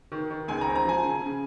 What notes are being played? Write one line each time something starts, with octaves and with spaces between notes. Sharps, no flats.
D#3
D#3
C#2 G#5
A#5
C4
A#5
F3 G#5
C#3
C#3